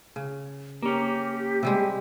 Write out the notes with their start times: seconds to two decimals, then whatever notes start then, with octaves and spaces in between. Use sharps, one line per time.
0.16 C#3
0.83 A#3 C#4 G4
1.63 C3 G3 G#3